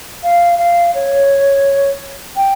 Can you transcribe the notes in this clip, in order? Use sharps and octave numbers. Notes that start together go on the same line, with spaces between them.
F5
F5
C#5
G5